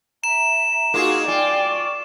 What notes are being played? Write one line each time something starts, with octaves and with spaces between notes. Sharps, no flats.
E5 A#5 E7
A#3 D#4 F4 F#4 G#4
F4 D5 G5 G#5
C#6